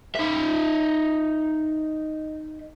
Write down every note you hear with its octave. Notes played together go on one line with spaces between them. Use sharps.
D#4 E5